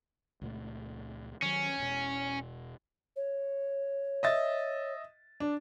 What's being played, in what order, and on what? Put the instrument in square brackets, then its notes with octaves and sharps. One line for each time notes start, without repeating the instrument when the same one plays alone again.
[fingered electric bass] C#2 A#2 A3
[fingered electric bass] D#3 F#3 [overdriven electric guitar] C#4
[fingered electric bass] E1 B2
[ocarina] C#5
[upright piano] D#5 E5 A6
D4